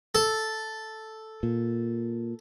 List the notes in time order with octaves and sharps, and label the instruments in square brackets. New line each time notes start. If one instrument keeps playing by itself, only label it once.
[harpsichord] A4
[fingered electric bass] A#2